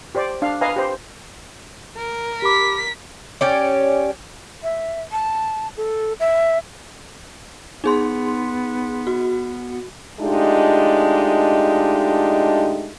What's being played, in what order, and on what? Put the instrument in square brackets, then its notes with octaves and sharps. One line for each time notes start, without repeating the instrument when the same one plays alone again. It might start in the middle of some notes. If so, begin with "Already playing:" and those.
[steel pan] G4 C5 D5
D4 F5
B4 D#5 F5 G#5 A#5
G4 C5
[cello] A#4
[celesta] G4 B5 D6 [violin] B6
[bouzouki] C#4 G4 D5
[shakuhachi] E5
A5
A4
E5
[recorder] B3 [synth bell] D#4 G#4 C6
[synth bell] F#4
[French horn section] G#3 A3 D4 D#4 F4 G4